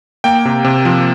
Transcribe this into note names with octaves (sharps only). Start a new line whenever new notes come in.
A#3 G5
C3
C3
F3